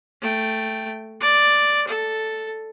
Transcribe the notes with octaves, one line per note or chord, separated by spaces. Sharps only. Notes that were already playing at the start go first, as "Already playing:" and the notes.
A3 G5
D5
A4